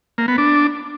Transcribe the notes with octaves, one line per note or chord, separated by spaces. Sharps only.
A#3
B3
D4